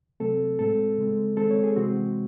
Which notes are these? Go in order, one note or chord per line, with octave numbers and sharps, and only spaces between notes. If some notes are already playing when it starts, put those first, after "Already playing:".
C3 F#3 A3 C4 A4
A2 G#3 C4 A4
C#3 G#3 C4
D#3 G#3 C4 A4
C#5
G#4
C3 E3 G#3 C4 F#4